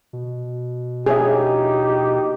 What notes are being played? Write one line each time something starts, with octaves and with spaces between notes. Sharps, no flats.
B2
A#1 D#4 G4 G#4 C#5 E5